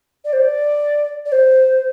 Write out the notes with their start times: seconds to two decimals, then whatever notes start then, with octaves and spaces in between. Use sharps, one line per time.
0.25 D5
0.33 C5
0.42 D5
1.26 D5
1.32 C5